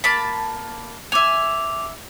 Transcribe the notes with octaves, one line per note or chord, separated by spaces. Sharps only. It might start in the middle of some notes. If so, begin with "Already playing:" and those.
A#3 A5 B5
E5 G#5 D6 F7